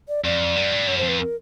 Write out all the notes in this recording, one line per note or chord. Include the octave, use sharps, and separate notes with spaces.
D5
F2 D5
F#2
G2
F#2 C#5
C5
F2
B4
A#4